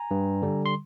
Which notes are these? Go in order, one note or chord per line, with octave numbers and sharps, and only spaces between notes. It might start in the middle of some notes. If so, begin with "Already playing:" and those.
Already playing: G#5 A#5
G2
D3 G3
C6